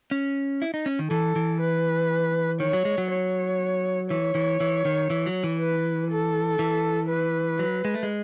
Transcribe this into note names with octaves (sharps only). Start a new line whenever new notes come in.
C#4
E4
D#4
C#4
D#3
E3 A4
E3
B4
D#3 C#5
F#3
G#3
F#3
C#5
E3 C#5
E3
E3
D#3
E3
F#3
E3
B4
A4
E3
B4
F#3
G#3
A3
G#3